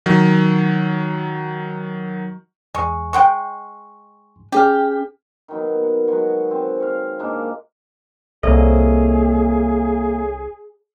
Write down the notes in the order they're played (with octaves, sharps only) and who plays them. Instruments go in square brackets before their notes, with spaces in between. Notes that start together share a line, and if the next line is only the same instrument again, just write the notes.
[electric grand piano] D#3 F#3
[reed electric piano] E2 C#6 [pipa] G#3
[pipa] G#3 F#5 G5 [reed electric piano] C6 C#6
[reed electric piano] C#4 G#4 F6 [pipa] G4
[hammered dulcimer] D#3 F#3 B3
F#5
F#3 G#3 F#4
C4
C#5 F5
A#2 G#3 A#3 D4
[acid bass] C2 [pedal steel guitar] A#3 D#5 [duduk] G#4 [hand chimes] A4 C#5 E5